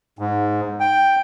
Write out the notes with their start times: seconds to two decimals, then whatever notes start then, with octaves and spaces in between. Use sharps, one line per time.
0.19 G#2
0.80 G5